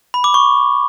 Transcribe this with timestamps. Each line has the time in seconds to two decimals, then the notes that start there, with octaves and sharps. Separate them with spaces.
0.14 B5
0.24 D6
0.34 C#6